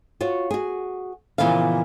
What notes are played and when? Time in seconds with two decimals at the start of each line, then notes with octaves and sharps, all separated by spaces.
0.21 F4 F#4 C#5
0.51 F#4 G#4
1.38 A#2 C#3 E3 F3 B3 F5